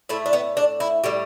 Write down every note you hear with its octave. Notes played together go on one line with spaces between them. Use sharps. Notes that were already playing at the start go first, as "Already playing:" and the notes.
A2 A3 E4
D4
B3
D4
E4
A2 G3 G4